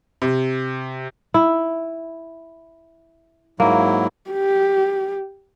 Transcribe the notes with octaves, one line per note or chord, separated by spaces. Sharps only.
C3
E4
G#2 F#3 A#3 E4
G4